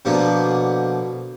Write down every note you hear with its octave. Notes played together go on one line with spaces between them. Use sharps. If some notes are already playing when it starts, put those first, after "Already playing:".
B2 D3 F3 A#3